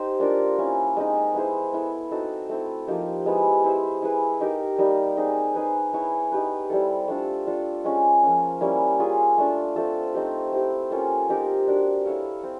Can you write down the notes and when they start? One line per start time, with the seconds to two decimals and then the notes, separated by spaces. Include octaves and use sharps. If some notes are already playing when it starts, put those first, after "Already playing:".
Already playing: D#4 G4 C5
0.20 A#3 D4 F4 A#4
0.58 A#3 C#4 E4
0.97 G#3 C4 D#4
1.34 B3 E4 G#4 C5
1.73 B3 E4 A4
2.11 C4 D#4 F#4 A4
2.49 A3 C4 E4
2.87 F3 A#3 D#4 G4
3.26 G#3 B3 E4 G4
3.64 E4 G#4 C5 E5
4.02 E4 G#4 B4
4.41 D#4 G4 A#4
4.79 G3 A#3 D#4
5.17 C4 D#4 G#4
5.55 D#4 G#4 B4
5.93 B3 E4 G#4 C#5
6.32 D#4 G4 B4
6.70 G3 C4 E4 A4
7.08 A3 D4 F4 A4
7.47 D4 F4 A4
7.85 G#3 C#4 F4
8.23 F3 A#3 C#4
8.61 G3 A#3 C#4 E4
8.99 C#4 F4 G#4
9.38 A3 D4 F4
9.76 A3 C4 F4 A4
10.14 C4 D#4 G4
10.53 C4 E4 G4
10.91 A#3 C#4 F4 A4
11.29 C4 D#4 G4 A#4
11.67 D4 F#4 A#4 D5
12.06 E4 A4 C#5 F5
12.43 C4